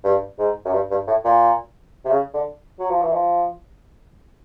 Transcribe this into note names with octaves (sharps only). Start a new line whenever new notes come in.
G2
G#2
F#2
G2
G2
A2
A#2
C3
C#3
D3
F#3
F3
E3
F3